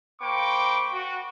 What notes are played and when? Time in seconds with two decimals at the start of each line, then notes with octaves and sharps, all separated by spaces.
0.21 A#3 C5 G5 B5 C#6 D6
0.93 F#4